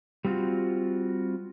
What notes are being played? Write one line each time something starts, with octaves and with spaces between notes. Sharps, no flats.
G3 C4 F4 F#4